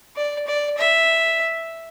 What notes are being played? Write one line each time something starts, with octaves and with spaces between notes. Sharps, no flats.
D5
D5
E5